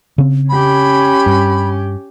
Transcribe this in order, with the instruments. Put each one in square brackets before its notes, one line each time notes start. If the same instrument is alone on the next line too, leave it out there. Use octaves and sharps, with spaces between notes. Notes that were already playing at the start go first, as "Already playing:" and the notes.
[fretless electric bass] C#3 C4
[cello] C#4 G4 [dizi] B5
[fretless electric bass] G2